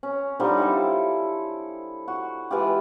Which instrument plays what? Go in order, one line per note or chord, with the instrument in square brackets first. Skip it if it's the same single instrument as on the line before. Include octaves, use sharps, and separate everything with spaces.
[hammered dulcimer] C#4
D3 F3 G3 D#4
E4 A4 C5
F#4
E3 G#3 F4 G4